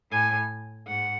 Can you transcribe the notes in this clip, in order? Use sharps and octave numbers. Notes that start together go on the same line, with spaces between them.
A2 G#5
G#2 F#5